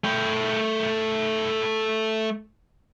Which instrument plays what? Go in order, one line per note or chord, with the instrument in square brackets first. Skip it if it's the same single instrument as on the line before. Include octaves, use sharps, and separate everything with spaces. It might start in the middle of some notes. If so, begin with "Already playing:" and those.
[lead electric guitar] A3 G5